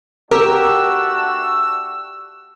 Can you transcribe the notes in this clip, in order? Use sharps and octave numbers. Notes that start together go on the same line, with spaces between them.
A3 D4 F#4 G4 A#4 E6